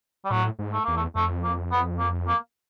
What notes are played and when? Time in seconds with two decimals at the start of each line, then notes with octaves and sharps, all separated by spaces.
0.24 G3
0.30 A2 F#3
0.59 G#2
0.73 A3
0.85 E2 A#3
0.96 A3
1.15 F2 A3
1.44 A#3
1.72 B3
1.99 A#3
2.28 A#3